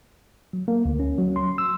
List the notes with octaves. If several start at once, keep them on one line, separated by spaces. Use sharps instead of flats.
F#3
A#3
D2
C#4
F#3
C6
E6